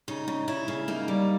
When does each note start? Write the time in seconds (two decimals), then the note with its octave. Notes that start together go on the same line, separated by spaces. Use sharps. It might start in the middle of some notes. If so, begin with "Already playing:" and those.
0.08 C#3 D#4
0.28 C#3
0.48 C#3 E4
0.68 C#3
0.88 A#3 D#4
1.08 G3